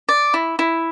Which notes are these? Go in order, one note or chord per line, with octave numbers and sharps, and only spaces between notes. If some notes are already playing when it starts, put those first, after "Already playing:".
D5
E4
E4